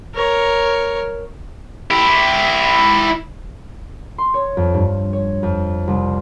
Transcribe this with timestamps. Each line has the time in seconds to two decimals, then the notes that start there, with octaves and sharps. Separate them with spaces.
0.14 A#4 C#5
1.91 E4 G4
4.18 C6
4.34 C#5
4.57 F2
4.74 G2
5.13 C#5
5.43 F2
5.88 C2